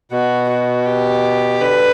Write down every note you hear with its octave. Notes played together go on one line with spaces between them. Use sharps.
B2 F#4
F#4
G4
D3 B4